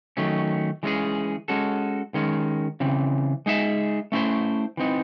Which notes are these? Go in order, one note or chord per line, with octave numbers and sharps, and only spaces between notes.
D#3 F#3 A3 C#4
E3 G#3 C#4 G#4
G#3 C#4 F#4 A4
D#3 G#3 C#4
C#3 E3 C4
G#3 D#4 G#4 C#5 E5
A3 C#4 E4 C5
E3 C4 D#4